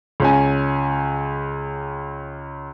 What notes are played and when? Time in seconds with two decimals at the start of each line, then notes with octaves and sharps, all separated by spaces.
0.20 C#2 C#4 G#5